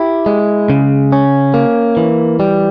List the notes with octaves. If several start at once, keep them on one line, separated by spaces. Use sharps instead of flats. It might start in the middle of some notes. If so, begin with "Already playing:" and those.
Already playing: E4 G4
G#3
C#3
C#4
A#3
E3
G3